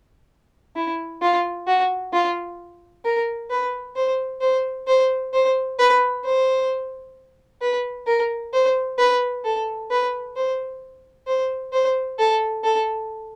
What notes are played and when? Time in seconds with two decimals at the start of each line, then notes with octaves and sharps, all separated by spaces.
0.76 E4
1.22 F4
1.67 F#4
2.13 F4
3.05 A#4
3.50 B4
3.96 C5
4.41 C5
4.87 C5
5.33 C5
5.79 B4
6.24 C5
7.61 B4
8.07 A#4
8.53 C5
8.98 B4
9.44 A4
9.90 B4
10.36 C5
11.27 C5
11.73 C5
12.19 A4
12.64 A4